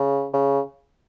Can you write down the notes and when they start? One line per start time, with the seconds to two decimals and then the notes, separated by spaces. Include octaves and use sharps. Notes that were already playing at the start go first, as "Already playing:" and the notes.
Already playing: C#3
0.33 C#3